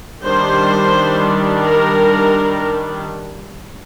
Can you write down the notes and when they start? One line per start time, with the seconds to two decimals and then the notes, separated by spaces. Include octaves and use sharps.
0.24 D#3 G3 D4 C5
1.63 A#4